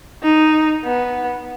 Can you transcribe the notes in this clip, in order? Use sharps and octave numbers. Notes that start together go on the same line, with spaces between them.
D#4
B3